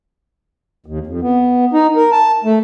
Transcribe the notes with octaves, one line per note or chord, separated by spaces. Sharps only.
D#2
F2
B3
D#4
A#4
A5
A3